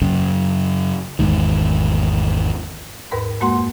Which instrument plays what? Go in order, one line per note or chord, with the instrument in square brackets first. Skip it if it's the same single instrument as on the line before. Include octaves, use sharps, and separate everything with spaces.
[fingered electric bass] F#2 C#3
G#1 E2 G#2 D#3
[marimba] D#2 G#2 A#4 B4 B5
F2 G#3 A#3 F#4 F#5 C6